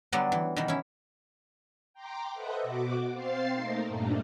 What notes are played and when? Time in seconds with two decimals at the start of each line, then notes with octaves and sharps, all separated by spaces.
0.12 D3 F#3 G3 B3 D4
0.32 E3
0.56 B2 D#3 E3
0.68 C#4 E4
1.94 G5 A#5 C6 D6
2.32 A4 B4 C5 D#5 E5 F#5
2.63 B2 F#4 D6
3.14 C4 C5 F5 A6 C7
3.51 A3 A#3 D#4 A#4
3.87 G2 A#2 G3 A3 A#3 D4